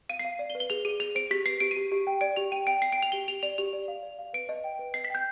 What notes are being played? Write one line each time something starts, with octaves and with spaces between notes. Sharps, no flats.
F5 D#7
C7
F5
D5
G7
B4
G7
G#4 F7
G#4 D#7
G#4 F7
C5 D7
G4 B6
B4 C7
G4 D7
D#7
G4
G4
G5
D5 D7
G4 F7
G5 D#7
G5 D7
G5 C7
D7
G5
F7
G4 G7
G4 F7
D5 F7
G4 F7
D5
F5
D5
F5
B4 D7
D#5
G5
B4
D#5 C7
B6
G5 G6